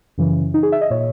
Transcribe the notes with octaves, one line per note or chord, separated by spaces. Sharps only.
F#2 C#3 E3
D#4
G#4
E5
D#5
A#2 C#5